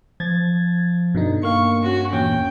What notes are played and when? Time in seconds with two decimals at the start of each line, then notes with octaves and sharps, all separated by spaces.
0.20 F3 G#6 A6
1.15 G2 B2 D3 D#4
1.43 A#3 F5 C#6
1.83 C#4 F#4
2.13 E2 A#2 C#4 G5